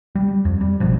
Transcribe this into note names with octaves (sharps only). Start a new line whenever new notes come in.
G3
F2
G3
G#1 F#2 B2 F3